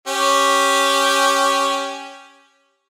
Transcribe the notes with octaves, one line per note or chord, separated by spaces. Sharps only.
C#4 G4